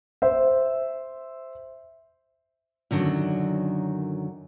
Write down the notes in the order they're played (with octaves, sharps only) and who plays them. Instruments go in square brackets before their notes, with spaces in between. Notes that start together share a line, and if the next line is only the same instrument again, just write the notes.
[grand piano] C5 E5
[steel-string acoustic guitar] F#2 D3 D#3 F3 F#3